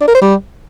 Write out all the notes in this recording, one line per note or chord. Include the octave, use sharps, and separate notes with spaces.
D4
A#4
C5
G3